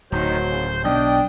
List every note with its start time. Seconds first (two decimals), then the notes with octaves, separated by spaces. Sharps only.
0.12 D1 D#3 F#3 C5
0.48 C2 F#2 C#3
0.84 B1 D4 D#5 G5